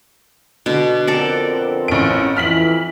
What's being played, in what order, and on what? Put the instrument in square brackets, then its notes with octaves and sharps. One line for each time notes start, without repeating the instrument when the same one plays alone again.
[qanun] B2 [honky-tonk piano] D3
[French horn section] F2 B3 C4 [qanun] A4 A#4 D5
[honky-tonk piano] A1 D7
[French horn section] F2 E3 [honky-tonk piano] F6 B6 F#7